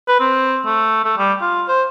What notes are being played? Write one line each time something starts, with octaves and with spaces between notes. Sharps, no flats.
B4
C4
A3
A3
G3
F4
C5